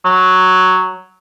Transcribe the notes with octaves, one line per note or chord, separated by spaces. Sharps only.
F#3